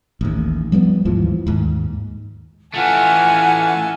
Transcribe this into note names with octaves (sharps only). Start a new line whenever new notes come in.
A1 D#2
F3 G3 A3 B3
D#2 G#2 E3 F3
D#2 G#2
E3 A3 F4 A4 F#5 G#5